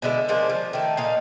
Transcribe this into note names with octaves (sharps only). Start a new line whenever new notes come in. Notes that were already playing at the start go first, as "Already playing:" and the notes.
B2 D3 G#3 E4
F3 G#3 A#3 D4
F3
D#3 A3
A#2 D#4 F5